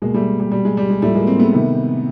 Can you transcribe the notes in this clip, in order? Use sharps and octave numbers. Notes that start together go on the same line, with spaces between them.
B2 G#3 A#3
G3 A3
G3
B2 G3
G#3
G3
G#3
A2 F3 G3 A3
G#3 A#3
A#3 C4
A3 B3
C3 D#3